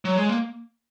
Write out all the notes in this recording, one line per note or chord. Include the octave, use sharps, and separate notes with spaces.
F#3
G#3
A#3